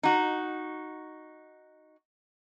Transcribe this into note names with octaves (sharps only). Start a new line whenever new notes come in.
D#4 F#4